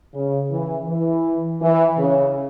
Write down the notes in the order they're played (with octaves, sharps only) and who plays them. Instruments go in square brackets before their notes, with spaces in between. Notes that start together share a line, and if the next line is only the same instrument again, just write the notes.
[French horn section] C#3
E3
E3
E3
C#3